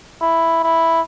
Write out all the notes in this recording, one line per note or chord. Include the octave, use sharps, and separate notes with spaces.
E4
E4